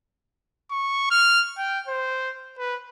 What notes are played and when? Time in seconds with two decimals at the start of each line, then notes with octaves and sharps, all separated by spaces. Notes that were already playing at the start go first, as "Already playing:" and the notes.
0.71 C#6
1.11 F6
1.57 G5
1.87 C5
2.58 B4